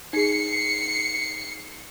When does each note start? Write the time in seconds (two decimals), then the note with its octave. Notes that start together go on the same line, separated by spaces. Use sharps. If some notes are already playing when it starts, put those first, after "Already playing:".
0.13 D#4 G#4 C7 C#7